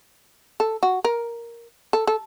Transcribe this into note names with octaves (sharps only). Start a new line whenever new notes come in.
A4
F#4
A#4
A4
A4